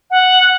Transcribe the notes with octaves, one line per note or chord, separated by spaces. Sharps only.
F#5